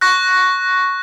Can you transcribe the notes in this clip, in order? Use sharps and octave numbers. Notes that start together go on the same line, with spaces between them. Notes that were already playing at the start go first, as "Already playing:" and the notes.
C#6 F#6 A#6